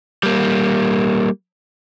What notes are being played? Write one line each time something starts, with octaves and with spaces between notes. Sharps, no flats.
G3 A#3